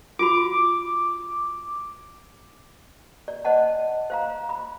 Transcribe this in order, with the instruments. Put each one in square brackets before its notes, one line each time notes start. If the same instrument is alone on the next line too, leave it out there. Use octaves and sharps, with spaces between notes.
[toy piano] F4 F#4 B5 [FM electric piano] D6
[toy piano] D5
C5 D#5 F#5 A5
C5 F5 A#5
B5